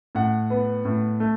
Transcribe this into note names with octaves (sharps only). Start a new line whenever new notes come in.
A2 F#5
B3
A2
A3